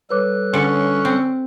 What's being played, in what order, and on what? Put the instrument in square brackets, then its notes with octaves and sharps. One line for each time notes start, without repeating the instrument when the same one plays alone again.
[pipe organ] G3 A4 F#6 [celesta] B4 C#5 D6
[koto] D3 [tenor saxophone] C#4
[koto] C4